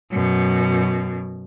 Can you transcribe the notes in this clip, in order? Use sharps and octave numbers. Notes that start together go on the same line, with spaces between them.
F#2 B2